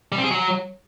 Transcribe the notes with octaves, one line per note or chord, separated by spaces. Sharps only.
G3
C4
G#4
F#3